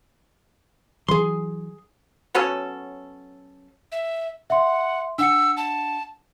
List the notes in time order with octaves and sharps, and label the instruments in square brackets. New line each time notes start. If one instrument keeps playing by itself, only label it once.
[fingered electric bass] E3 F#3 [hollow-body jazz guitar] G#4 C6
[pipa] F#3 B3 C#4 A4
[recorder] E5
[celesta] E5 C6 [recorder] F#5
[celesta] D4 F#5 C#7 [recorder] E6
[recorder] A5